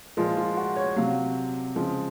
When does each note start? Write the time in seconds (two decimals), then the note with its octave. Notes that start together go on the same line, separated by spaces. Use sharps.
0.17 A#2 F3 G#3 F4
0.37 F4
0.57 F#4
0.76 C#5
0.96 C3 F#3 F5
1.76 C#3 F3 G#3